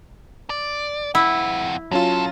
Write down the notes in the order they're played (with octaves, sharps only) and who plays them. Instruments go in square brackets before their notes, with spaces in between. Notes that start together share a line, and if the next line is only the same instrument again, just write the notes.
[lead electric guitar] D5
[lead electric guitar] F2 F#5 [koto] E4
[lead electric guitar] F#2 A4 [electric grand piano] F#3 C#4 F4